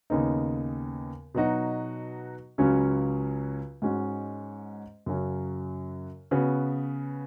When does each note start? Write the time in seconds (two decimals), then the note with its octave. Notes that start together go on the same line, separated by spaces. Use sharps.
0.10 D#2 C#3 B3 D#4
1.35 B2 F#3 D#4 F#4
2.58 C#2 C#3 F#3 C#4
3.82 G#2 G#3 C#4 F#4
5.06 F#2 C#3 F#3 C#4
6.31 C#3 B3 F#4